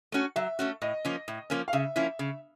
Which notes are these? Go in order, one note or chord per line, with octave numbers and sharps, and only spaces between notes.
A3 C#4 F#4
F#3 E5
A3 C#4 F#4
A2 D#5
F3 A#3 C#4
A2
F3 A#3 C#4
F5
C#3 E5
F3 A#3 C#4 E4
C#3